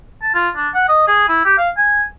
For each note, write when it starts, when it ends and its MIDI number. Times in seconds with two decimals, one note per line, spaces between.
0.22 0.30 81
0.34 0.49 65
0.56 0.69 62
0.74 0.84 78
0.89 1.03 75
1.08 1.24 68
1.29 1.41 64
1.45 1.55 67
1.58 1.70 77
1.77 2.04 80